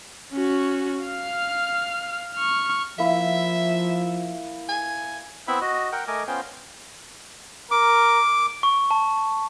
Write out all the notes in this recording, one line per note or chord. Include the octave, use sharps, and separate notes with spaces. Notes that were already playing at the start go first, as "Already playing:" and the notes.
C#4 F#4
F5 F6
C#6 F6
F3 A#3 E4 E5
G#5
B3 C4 E4 E5 B5
F#4 D#5
A#4 F#5 G5
A3 A#4 D#5 G#5 D6
B3 C#4 F4 C5 G5
A#4 D6
C#6
A5